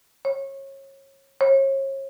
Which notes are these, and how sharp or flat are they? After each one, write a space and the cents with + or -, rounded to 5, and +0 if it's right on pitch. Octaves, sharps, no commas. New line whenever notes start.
C#5 -25
C#5 -35